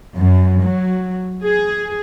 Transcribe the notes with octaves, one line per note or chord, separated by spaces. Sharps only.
F#2
F#3
G#4